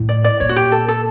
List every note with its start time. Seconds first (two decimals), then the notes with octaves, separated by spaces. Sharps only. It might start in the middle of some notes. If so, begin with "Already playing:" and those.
Already playing: A2
0.09 D5
0.24 D5
0.40 A#2 C#5
0.49 F#4
0.56 G4
0.72 A4
0.88 A4